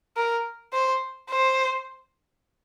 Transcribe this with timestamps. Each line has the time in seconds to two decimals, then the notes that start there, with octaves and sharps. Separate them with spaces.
0.17 A#4
0.73 C5
1.30 C5